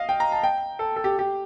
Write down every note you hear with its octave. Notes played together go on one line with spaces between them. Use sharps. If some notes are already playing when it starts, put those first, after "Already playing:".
Already playing: D#5 F5
G5
A#5
A5
G5
A4
A4
G4
G4